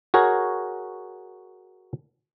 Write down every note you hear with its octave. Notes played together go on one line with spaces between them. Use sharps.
F#4 G#4 A#4 C#5